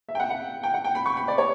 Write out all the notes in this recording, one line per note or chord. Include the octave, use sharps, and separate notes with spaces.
E5
G5
F#5
F#5
G5
F#5
G5
B5
C#6
B5
D5
C#5